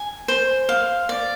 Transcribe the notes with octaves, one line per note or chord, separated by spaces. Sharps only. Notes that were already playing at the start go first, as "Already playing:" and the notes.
Already playing: G#5
C5
F5
D5